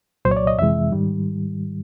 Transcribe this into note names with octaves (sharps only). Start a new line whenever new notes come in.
C2 A#2 F#3 C5
C#5
D5
D#5
F2 C3 E3 G#3 E5
G#2 D#3 G3